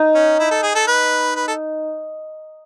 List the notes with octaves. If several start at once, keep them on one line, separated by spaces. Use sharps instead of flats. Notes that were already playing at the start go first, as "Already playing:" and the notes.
Already playing: D#4
C#4
E4
A4
G#4
A4
B4
B4
A4